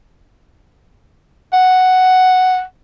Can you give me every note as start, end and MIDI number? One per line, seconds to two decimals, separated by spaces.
1.53 2.62 78